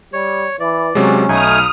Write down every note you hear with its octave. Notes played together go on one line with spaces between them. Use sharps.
G3 C#5
E3 D5
C3 F#3 G#3 C#4
B1 A3 D#4 G#5 D#6 F6